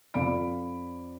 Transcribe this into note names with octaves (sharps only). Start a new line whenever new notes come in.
F2 D5 F5 B5 D7